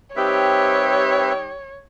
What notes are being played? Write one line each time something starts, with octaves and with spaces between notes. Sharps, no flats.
G3 C4 D#4 G4 B4 C#5 E5